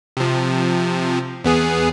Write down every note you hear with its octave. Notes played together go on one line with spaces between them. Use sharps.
C3 F3
E2 B3 G#4